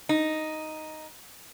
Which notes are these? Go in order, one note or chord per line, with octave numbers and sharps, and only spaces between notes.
D#4